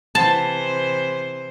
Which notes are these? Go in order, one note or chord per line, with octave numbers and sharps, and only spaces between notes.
C3 E3 C5 A5